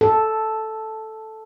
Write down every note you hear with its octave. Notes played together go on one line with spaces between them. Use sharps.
A4